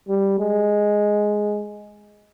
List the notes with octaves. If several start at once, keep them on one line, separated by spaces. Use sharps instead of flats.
G3
G#3